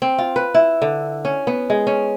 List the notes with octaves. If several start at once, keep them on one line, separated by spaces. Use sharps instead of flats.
C4
F4
B4
E4
D3
C#4
B3
G#3
C#4